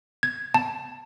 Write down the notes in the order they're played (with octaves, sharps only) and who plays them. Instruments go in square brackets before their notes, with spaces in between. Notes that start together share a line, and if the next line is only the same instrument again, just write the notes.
[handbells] G#6
A5